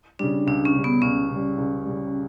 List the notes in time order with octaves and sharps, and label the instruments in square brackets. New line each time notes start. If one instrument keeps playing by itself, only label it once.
[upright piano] C#3 G3 [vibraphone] D4
[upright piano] C#2 [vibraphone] D4
[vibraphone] C#4
[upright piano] C#3 G3
[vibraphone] B3
[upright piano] C#2 [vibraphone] C#4
[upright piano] C#3 G3
C#2
C#3 G3